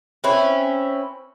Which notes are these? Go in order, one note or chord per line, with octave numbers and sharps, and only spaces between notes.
C4 C#4 E4 B4